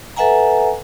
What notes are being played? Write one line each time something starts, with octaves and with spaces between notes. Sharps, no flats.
A4 B4 E5 F#5 G#5 A#5